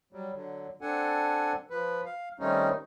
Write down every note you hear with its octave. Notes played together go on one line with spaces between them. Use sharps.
F#3 G3
D3 F#3
C4 D4 A4 F#5 G#5
F3 B4
F5
D#3 G3 A3 C4 C#4 D#4